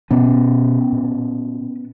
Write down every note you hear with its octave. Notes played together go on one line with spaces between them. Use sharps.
B2 B3 C#4
A#2